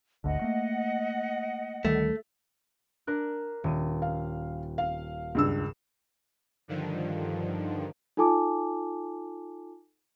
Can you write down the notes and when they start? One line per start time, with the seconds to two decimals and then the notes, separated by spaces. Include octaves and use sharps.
0.24 G#1 D2 D3 D#5 F#5
0.41 A3 A#3
1.85 D2 D#3 G3 A3
3.07 D4 A#4 F#6
3.64 D#1 D#7
4.02 F5
4.78 F5
5.35 C#2 G2 E6
6.68 G2 D3 D#3 F3
8.17 D#4 F4 A4 G#5 A5 D6